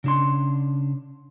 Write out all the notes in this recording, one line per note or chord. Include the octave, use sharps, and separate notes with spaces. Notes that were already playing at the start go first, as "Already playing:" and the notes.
C#3 D4 C6